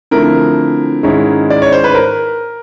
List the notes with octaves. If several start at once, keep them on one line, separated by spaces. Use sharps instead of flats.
D3 F3 A3 C4 E4 A#4
G#2 D#3 G#3 C#4 E4
D5
C#5
C5
B4
A#4